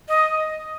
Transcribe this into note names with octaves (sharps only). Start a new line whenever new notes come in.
D#5